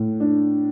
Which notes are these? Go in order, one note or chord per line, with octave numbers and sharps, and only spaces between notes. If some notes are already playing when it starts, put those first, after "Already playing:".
Already playing: A2
D4